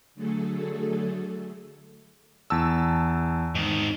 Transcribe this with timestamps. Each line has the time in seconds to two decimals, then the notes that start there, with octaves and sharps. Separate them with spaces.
0.15 D3 F#3 A3 G#4 A4
2.50 E2 A5 E6
3.55 G#2 D#3